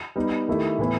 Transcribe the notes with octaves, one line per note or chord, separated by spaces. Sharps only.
G3 B3 D#4
D#3 A3 E4 G4
A2 E3 B3 E4